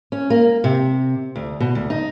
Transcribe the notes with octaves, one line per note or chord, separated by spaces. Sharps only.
C#4
A#3
C3
D2
B2
D2
D#4